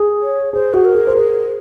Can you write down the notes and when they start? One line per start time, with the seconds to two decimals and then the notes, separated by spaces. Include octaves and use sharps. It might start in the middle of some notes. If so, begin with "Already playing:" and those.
Already playing: G#4
0.21 C#5
0.53 G#4 C5
0.74 F#4 G#4
0.85 A#4
0.95 G#4
1.07 C5
1.15 G#4 A#4